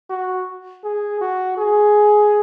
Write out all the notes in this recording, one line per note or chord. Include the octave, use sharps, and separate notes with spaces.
F#4
G#4
F#4
G#4